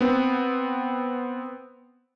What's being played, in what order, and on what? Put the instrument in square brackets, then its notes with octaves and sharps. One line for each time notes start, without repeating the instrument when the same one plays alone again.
[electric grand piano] B3 C4